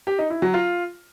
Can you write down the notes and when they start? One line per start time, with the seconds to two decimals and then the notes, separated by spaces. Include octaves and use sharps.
0.07 G4
0.19 D#4
0.30 E4
0.42 F#3
0.54 F4